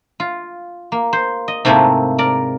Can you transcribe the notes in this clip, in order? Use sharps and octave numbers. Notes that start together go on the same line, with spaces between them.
F4
A#3
C5
D#5
G#2 C3 A3 A#3 C4 E4
A#4 D5